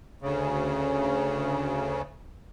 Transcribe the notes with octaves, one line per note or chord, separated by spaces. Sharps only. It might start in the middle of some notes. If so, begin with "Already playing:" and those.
D2 C#3